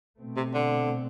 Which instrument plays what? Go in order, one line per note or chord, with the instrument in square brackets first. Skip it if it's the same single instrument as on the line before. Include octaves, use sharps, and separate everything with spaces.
[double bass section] B2 A3 C4
[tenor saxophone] C3
D3